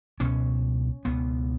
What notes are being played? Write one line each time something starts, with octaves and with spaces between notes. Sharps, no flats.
C#2 B2 C#4
C#2 B2 B3